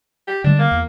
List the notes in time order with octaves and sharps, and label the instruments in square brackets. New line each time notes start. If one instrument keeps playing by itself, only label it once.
[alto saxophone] G4
[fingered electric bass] D3 G3 G#3 [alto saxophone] D4
[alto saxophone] A#3
[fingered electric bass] E2